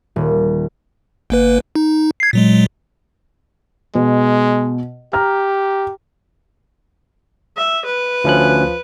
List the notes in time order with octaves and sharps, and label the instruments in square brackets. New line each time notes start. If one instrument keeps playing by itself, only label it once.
[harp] D#1
[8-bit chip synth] G1 A#3 B4
D#4
G#6 C7
A#2 F#3 G#3
[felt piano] B2 [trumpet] G#3
[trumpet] G4 [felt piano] A#5 F6
[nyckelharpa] E5
B4
[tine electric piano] D2 C#4 F#6 [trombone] F3